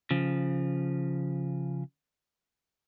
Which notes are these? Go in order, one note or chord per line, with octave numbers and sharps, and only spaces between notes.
C#3 F3